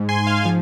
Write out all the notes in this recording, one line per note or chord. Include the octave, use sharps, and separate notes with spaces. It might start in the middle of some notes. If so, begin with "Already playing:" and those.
Already playing: G#2
G#5 C6
G#2
F5 G#5
F3